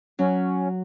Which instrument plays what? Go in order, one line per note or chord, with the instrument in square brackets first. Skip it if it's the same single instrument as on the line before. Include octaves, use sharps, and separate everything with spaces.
[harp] F#3 [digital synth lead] C#4